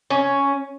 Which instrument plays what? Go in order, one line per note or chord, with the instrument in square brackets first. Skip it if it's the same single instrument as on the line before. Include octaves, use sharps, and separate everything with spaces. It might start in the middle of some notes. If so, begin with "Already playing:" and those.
[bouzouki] C#4